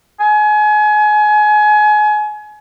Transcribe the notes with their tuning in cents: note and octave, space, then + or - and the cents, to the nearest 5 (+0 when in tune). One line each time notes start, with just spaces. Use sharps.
G#5 +30